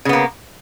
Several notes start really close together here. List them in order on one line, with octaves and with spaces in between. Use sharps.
C#3 B3 A#3